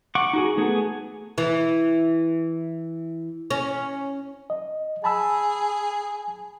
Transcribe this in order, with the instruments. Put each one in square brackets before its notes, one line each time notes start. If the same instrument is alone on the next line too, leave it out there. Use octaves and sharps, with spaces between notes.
[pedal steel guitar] F#5 C#6 D6
D#4 F#4 G#4
A3 B3 G#4
[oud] E3
C#4
[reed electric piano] D#5
[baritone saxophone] G#4 [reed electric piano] A5 B5 E6